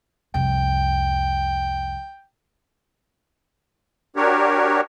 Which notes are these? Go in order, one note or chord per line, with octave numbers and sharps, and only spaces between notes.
C2 F2 G5
D4 F#4 G4 A#4 C#5